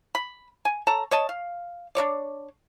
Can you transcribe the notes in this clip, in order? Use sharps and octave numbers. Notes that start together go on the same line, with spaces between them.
B5
G#5
A4 C#5 A5 A#5
C#5 D#5 A5
F5
D4 A#4 C#5 D5